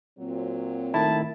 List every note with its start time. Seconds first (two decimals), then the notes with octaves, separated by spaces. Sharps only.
0.19 A#2 F#3 C4
0.94 D#3 A3 E4 A5